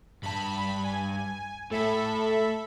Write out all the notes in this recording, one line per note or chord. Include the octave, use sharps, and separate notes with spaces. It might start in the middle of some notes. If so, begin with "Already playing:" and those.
G2 A5 B5
G#5
A2 A4 E5 B5